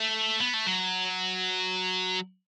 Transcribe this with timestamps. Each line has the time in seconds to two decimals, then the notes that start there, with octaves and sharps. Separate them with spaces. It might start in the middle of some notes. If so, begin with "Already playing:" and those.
Already playing: A3
0.40 B3
0.53 A3
0.66 F#3